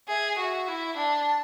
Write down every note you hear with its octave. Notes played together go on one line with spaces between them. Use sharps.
G#4 E5
F#4 E5 G#5
E4
D4 A5